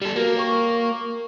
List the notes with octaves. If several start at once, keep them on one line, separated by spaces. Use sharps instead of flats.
G3 A4 E7
A#3 F#4 A#4 B4
C#5 G5 C#6
C#6